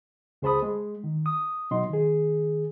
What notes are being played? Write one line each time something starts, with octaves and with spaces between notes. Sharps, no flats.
C#2 G#4 C5 A5 B5 D#6
G#3
D#3
D#6
B2 F#3 D#4 D#5 C6
D#3 G#4